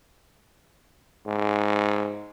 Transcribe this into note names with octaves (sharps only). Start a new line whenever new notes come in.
G#2